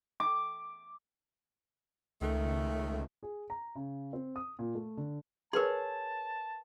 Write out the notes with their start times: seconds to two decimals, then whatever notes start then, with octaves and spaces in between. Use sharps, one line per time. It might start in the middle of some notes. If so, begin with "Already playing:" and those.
0.20 D6
2.21 C#2 D#3 A3
3.23 G#4
3.50 A#5
3.75 C#3
4.13 C4
4.36 D#6
4.59 A#2
4.75 A3
4.97 D3
5.53 G#4 A#4 B4 C#5 A5 C6